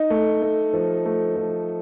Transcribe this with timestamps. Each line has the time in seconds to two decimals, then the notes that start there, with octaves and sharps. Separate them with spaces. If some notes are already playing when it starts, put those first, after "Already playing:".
Already playing: D#4
0.10 A3
0.42 A3
0.73 F3
1.05 A3
1.36 F3